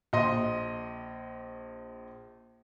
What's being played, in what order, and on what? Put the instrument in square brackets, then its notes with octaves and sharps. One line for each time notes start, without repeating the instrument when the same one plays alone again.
[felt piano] A#1 D#5 C6